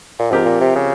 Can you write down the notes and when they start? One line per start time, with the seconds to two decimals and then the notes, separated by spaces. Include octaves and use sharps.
0.19 A#2
0.31 G#2 F3 C4 G4 A#4
0.46 A#2
0.61 C3
0.76 C#3